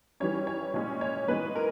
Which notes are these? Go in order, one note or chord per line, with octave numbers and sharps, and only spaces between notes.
E3 G3 C#4 C#5
C#5
A#2 G#3 C#4 C#5
C#5
E3 G#3 B3 B4
A#4